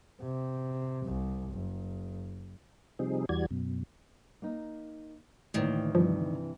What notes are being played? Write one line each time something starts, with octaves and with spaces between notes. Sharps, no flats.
C3
C2
F#1
C3 F3 G3 C4 D#4 G#4
E2 E3 G3 F#4 D5 G#6
F#2 B2
A#3 D#4
D2 A2 D#3 E3 A#3
G2 C3 E3 F3